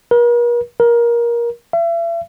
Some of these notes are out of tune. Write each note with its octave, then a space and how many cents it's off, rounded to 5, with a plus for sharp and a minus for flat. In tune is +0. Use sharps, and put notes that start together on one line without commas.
A#4 +45
A#4 +20
E5 +40